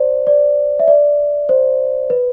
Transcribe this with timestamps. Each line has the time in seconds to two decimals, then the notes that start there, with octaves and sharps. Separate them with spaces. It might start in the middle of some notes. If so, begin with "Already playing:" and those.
Already playing: C5 D5
0.27 D5
0.79 E5
0.88 D5
1.49 C5
2.10 B4